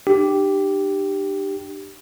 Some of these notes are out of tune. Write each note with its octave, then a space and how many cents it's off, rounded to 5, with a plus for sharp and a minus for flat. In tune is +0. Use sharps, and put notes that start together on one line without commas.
D4 +45 G4 -5